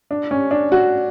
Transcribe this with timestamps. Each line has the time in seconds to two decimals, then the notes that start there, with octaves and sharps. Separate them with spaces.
0.11 D4
0.31 C#4
0.51 D4
0.72 F#4